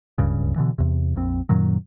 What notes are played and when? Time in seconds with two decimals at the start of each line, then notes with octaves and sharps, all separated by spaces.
0.18 D1 C#2 G2 C#3
0.56 B2 D3 E3
0.78 E2 C3
1.16 A#1 F2 C4
1.49 F#2 A#2 D#3 F#3